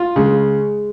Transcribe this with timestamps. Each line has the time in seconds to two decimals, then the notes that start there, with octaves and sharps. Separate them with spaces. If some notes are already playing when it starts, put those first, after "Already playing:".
Already playing: F4
0.16 C#3 G#3